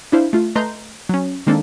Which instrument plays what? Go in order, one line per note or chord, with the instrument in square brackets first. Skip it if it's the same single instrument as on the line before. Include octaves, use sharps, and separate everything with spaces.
[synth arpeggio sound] D4 E4 C5 F5
A3 F4
A3 B4 D#5 A#5 C6 G6
F#3 C#4
D#3 G#3 A#3 C4 D4 A4